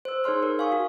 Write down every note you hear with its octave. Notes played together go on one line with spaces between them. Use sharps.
C5 E6
D#4 G#4 C#5 C6 F6
A#4
F5 G#5 C#6 D#6
F#4